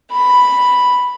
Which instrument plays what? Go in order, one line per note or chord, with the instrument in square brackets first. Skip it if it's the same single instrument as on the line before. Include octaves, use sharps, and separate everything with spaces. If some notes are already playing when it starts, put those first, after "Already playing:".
[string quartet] B5